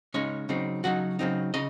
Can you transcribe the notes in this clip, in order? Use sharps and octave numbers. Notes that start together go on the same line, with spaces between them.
C#3 G#3 C#4 D#4 C#5
C#3 F#3 C4 D#4
C#3 F#3 C4 D#4 F#4 F#5
C#3 F#3 C4 D#4
C#3 D#4 D#5